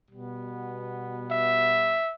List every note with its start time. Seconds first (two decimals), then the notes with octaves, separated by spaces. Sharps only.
0.11 B2 G3 B3
1.31 E5